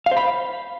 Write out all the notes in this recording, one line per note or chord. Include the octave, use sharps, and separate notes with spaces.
F5
C5
B5